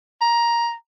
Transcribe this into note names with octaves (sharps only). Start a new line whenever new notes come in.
A#5